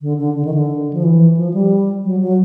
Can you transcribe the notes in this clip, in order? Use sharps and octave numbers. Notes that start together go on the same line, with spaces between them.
D3
D3
D3
D#3
D3
F3
E3
F3
G3
F#3
F#3